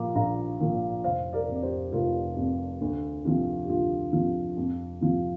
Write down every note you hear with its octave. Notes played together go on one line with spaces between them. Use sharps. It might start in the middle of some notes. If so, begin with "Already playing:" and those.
Already playing: A#2 F3 A#5 D6
A#1 F5 A#5
A#2 F3
F1 C5 F5
A#4 D5
F2 C3
D5
G4 C5
F1 F4 A#4
F2 C3
D2
C3 F3
G4
D2 F4
C3 F3
F2
C3 F3